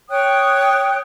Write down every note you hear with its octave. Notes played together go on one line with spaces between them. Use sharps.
C#5 G5 D#6 F#6